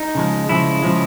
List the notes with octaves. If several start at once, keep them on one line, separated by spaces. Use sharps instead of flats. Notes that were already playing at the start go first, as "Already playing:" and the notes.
Already playing: D#4
C#3 F3 G#3
C#3 F3 G#3 E4
C#3 F3 G#3